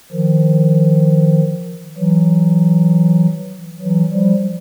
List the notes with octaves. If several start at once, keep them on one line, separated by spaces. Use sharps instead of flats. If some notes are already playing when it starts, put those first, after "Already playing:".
D#3 F3
E3 F#3
E3 F#3
F3 G3